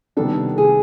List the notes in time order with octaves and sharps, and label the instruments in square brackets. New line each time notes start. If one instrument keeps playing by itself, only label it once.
[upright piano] C3 D#3 G3 B3 D4 [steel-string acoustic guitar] A4
[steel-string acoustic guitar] G#4